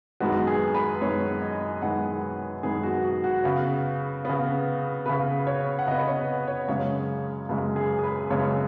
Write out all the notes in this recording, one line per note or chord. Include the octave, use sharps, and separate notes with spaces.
F#2 D#3 G#3 B3 F#4
G#4
B4
F#2 D#3 G#3 B3 C#5
D#5
F#2 D#3 G#3 B3 F#5
F#2 D#3 G#3 B3 G#4
F#4
F#4
F#4
C#3 B3
C#3 B3
C#3 B3 B4
C#5
F#5
C#3 B3 D#5
B4
C#5
C#5
F#2 C#3 G#3 C#5
F#2 C#3 G#3 B4
G#4
G#4
B4
F#2 C#3 G#3 C#5